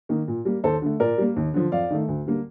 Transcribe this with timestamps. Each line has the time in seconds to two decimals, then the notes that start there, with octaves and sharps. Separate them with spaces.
0.09 D#3 A#3
0.28 A#2
0.45 G3 A#3
0.64 D#2 A4 C5
0.82 D3 A3
1.00 A#2 A#4 D5
1.18 G3 A#3
1.36 D#2
1.54 D3 F3
1.72 F2 D5 F5
1.91 D#3 A3
2.08 D2
2.26 D3 G3 A#3